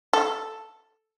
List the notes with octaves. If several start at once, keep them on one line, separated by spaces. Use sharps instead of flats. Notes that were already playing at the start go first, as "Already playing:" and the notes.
A4